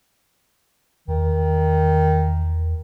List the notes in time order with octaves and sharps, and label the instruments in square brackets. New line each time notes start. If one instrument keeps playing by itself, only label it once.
[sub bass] E2 [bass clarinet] D#3